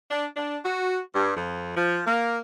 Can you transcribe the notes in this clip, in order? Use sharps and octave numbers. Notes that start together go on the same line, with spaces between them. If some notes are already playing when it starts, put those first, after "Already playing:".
D4
D4
F#4
G2
F2
F3
A#3